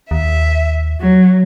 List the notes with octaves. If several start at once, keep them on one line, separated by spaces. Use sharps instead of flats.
D#2 E5
F#3